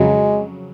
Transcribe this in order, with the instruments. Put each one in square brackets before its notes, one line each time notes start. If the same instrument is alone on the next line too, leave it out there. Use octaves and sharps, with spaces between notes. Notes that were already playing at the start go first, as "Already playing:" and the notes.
Already playing: [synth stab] F2 C#3 F#3 [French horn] G#3